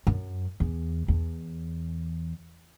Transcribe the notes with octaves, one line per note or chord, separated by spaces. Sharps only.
F#2
E2
E2